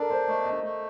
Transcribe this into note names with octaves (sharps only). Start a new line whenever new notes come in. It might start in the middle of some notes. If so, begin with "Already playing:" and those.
Already playing: D4 A4 A#4 D5
C5
A3 D#5
D#5
A3